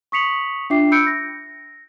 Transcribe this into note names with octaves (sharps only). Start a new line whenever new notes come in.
C#6 D#6 B6 C#7 F7 F#7
D4 F4 E5 G5 D6 C7
B5 E6 F#6 G6 C#7 D7
A#6